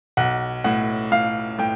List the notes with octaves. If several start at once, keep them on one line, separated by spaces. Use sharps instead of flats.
B1 F#5
A2 F#5
A2 F5
A2 G5